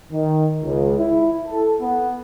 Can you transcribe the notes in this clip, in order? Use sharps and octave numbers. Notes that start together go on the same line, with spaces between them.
D#3
C#2
E4
A4
B3